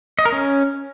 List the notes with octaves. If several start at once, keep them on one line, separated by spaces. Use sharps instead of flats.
D#5
A#4
C#4